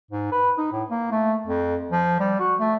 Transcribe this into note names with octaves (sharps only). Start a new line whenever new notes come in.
G#2
B4
D#4
A2
A#3
A3
F2
F3
G3
F#4
A3